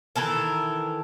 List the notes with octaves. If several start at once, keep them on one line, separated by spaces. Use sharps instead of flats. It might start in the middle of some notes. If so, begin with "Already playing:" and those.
D#3 E3 A4 A#4